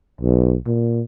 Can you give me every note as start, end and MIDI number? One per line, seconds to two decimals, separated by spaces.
0.21 0.56 35
0.66 1.02 46